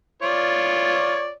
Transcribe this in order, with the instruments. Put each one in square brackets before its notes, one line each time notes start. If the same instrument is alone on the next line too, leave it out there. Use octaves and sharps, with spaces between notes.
[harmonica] F4 C#5 D5